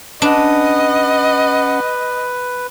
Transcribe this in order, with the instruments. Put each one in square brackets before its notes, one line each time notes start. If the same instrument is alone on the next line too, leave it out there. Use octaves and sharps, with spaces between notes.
[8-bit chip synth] C#4 F#5 [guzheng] D4 [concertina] B4 [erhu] D#5